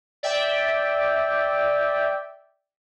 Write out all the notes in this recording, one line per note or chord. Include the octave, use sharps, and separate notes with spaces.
D5 E5 G5